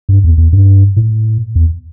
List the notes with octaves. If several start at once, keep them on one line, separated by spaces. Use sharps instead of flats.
G2
E2
E2
G2
A2
E2